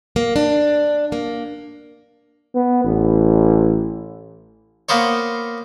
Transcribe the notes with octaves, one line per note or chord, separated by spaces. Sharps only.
A#3
D4
A#3
B3
A1
A#3 B3 C5 C#5